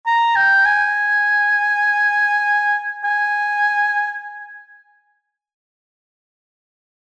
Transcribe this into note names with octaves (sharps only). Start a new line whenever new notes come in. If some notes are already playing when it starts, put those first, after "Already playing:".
A#5
G5
G#5
G#5